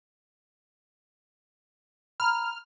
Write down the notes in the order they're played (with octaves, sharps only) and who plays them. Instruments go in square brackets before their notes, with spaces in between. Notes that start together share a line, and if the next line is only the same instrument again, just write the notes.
[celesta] A#5 B5 [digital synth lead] F6